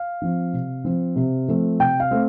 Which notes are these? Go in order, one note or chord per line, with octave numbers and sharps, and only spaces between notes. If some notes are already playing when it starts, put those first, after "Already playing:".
Already playing: F5
F3 C4
C3
F3 C4
C3
F3 A3 C4
C3 G5
F5
A3 C4